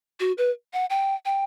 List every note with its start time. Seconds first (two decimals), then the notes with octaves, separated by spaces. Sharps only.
0.20 F#4
0.38 B4
0.73 F#5
0.90 G5
1.25 G5